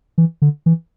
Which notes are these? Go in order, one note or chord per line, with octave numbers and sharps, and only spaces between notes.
E3
D3
E3